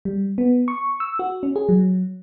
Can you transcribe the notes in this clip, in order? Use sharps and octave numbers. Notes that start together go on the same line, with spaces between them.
G3
B3
C#6
E6
F#4
C#4
G#4
F#3